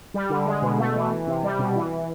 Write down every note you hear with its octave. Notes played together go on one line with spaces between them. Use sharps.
G3
D3
G#3
B2
A3
E3
E3
C3
G3
B2
E3